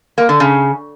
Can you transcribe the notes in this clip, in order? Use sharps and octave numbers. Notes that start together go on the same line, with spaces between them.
A#3
D3
C#3